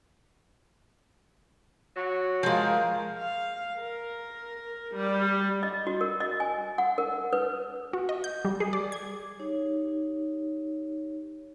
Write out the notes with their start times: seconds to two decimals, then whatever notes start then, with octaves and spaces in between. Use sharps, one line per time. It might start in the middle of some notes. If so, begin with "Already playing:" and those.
1.96 F#3 F#4
2.43 F3 G#3 A#4 F5
3.18 F5
3.77 A#4
4.94 G3
5.63 D#5
5.87 F#4
6.01 A#4
6.20 D#5
6.40 G#5
6.78 F#5
6.98 A#4
7.33 B4
7.93 F#4
8.09 D#5
8.24 G6
8.45 G3
8.60 G#4
8.73 D5
8.92 G#6
9.39 D#4 G4 C#5